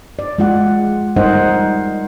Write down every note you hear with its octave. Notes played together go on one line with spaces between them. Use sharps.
D5
G#3 F4 F#5
G3 D#4 A#4 C5 D#5 F#5